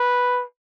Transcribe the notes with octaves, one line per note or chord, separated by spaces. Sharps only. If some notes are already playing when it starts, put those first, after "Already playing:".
Already playing: B4